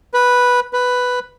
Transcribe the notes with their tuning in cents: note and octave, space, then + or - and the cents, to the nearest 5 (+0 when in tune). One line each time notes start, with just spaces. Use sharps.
B4 -5
B4 +5